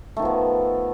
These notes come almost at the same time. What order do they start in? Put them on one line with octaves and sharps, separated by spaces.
A3 D#3 F3 B3